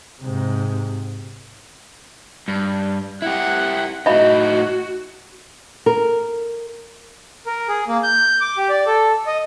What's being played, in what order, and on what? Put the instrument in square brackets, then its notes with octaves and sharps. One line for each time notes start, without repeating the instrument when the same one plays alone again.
[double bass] G#2 C3
[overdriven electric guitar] G2
[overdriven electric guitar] E4 G4 [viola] F#5
[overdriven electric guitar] A2 D#4 [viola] F#4 [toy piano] D#5 E5 B5
[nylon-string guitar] A#4
[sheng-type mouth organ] A#4
G#4
A#3
G6
D6
G4
D5
A4
D#5